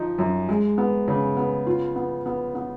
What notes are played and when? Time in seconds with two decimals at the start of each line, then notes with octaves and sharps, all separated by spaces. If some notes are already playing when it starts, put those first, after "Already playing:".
Already playing: F3 D#4
0.18 F#2
0.49 G#3
0.78 B3
1.08 C#3
1.37 B3
1.67 F4
1.96 B3
2.26 B3
2.55 B3